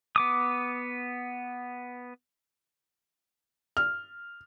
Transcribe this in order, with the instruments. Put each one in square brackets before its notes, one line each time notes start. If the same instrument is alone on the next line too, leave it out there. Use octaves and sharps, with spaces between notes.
[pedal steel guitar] B3 D6 D#6
[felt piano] F6